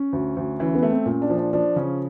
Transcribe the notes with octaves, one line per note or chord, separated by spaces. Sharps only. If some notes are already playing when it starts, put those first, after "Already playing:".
Already playing: C#4
D2
D2
E3 C#4
B3
A3
C4
A#2 C#4
D4
F3
D4
F3 D4
C#3 C#4